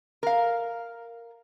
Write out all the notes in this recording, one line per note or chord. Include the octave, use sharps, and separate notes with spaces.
A#4 F5